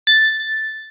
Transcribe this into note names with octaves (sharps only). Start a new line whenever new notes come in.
A6